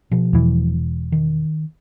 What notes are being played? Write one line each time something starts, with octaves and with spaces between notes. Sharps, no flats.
B2 F3
E1 E3
D#3